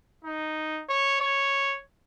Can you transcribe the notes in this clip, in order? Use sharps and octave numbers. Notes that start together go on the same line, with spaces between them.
D#4
C#5
C#5